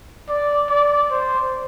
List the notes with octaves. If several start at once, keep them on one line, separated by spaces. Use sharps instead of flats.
D5
D5
C5